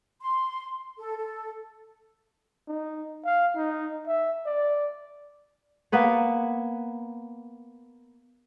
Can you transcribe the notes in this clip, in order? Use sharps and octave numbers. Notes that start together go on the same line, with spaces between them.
C6
A4
A4
D#4
F5
D#4
E5
D5
A#3 B3 B4 C#5